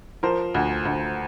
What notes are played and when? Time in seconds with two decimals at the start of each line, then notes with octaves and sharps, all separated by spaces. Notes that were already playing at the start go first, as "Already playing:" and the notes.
0.23 F3 A#4 C5
0.54 D2
0.85 D2